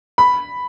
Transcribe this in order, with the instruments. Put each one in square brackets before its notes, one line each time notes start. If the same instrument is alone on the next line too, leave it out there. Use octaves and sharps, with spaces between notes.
[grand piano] B5